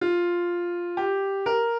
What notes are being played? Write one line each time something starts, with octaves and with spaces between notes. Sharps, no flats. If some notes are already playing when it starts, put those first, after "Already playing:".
F4
G4
A#4